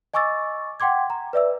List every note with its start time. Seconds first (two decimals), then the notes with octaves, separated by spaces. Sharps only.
0.14 D#5 G#5 C#6 D6 E6 A6
0.80 F#5 G5 C6 D6 G#6
1.10 A#5
1.33 B4 D5 E5 E6